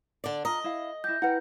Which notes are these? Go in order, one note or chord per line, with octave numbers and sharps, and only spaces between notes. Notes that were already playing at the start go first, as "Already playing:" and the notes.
D3 D5
F4 D#5 A#5
E4 F5
E4 G4 G6 A#6
E4 B4 F#5 G5